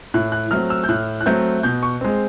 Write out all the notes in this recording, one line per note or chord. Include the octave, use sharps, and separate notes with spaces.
A2 F#6
F#6
F#3 A3 C4 F6
E6
G6
A2 F#6
F#6
F#3 A3 C4 G6
B2 G6
C#6
G#3 C4